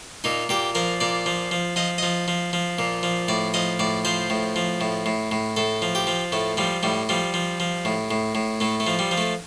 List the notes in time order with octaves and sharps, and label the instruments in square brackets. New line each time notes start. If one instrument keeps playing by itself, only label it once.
[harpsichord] A#2 D#4
A#2 G4
F3 A#4
A#2 D5
F3
F3
F3 D#5
F3 D#5
F3
F3
A#2
F3
A2 D5
F3 D#5
A2 D5
F3 C5
A2
F3
A2
A2
A2
A2 A4
F3
G4
F3
A2 A3
F3 G3
A2 G3
F3 G3
F3
F3
A2
A2
A2
A2 A3
A3
F3
G3
F3
A3